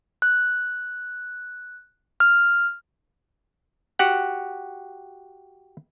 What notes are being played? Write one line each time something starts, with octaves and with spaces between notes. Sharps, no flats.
F#6
F6
F#4 G4 F#5